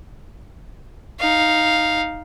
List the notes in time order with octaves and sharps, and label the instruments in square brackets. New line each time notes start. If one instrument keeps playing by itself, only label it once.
[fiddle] D#4 F5